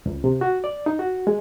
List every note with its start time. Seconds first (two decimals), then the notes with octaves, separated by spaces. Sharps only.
0.06 C#2
0.24 C3
0.41 F#4
0.64 D5
0.86 D#4
0.99 F#4
1.27 G#3